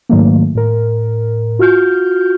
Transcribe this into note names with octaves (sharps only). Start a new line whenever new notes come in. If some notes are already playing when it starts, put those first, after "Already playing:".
G#2 D#3 F#3 A3 A#3
A2 A#4
F4 F#4 F6 G6